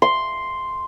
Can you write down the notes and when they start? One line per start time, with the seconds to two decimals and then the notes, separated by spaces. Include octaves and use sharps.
0.02 C6